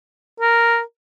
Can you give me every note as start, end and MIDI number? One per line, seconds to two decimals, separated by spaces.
0.40 0.80 70